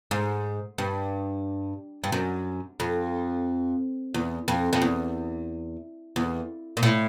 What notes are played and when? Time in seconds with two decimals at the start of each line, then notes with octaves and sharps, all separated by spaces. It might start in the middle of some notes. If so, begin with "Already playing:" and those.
0.11 G#2
0.78 G2
2.04 G2
2.12 F#2
2.80 F2
4.14 E2
4.48 F2
4.73 F2
4.82 E2
6.16 E2
6.77 A#2
6.83 A2